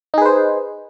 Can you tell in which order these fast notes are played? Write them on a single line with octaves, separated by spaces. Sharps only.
D#4 G#4 B4 C5